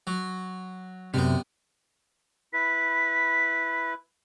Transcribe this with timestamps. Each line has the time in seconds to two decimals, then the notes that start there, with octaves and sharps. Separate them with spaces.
0.07 F#3
1.14 F#2 C3 G3 B3
2.53 E4 B4 B6